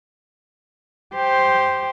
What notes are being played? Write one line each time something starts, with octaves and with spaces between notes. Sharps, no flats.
G4 C5